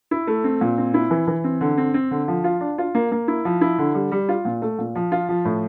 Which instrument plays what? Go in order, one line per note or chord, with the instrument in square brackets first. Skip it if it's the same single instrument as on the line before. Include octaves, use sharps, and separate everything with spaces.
[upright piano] E4
A3
C4
A#2
C4
E4
E3
E3
C4
D3
C4
C4
D3
F3
F4
D4
F4
A#3
A#3
E4
F3
E4
D3
G3
G3
F4
A#2
A3
A#2
F3
F4
F3
A2